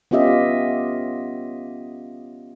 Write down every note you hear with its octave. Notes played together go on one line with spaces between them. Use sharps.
B3 C#4 F4 G4 D#5 E5